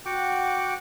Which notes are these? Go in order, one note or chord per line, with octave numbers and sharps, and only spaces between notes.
F#4 F#5 G5 D6